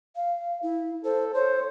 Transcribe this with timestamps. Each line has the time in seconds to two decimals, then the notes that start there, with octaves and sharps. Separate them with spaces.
0.16 F5
0.63 E4
1.05 A4 C5
1.35 C5 C#5